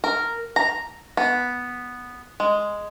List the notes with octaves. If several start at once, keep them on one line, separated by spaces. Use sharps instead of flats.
A#4
A#5
B3
G#3